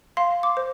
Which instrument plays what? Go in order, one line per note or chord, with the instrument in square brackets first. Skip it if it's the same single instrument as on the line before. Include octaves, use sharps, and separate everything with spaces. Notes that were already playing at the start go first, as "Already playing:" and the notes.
[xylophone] F5 C6
D6
C5